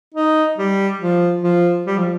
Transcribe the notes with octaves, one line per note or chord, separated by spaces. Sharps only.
D#4
G3
F3
F3
G3
F3